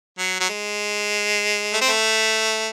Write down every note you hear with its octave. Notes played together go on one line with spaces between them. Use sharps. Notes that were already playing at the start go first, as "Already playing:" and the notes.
F#3
F#3
G#3
A3
C4
A3